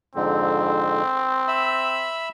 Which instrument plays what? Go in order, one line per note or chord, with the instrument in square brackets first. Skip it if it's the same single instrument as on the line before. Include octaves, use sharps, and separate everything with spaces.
[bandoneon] F2 G#2 D3 [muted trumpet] C4
[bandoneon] E5 B5 E6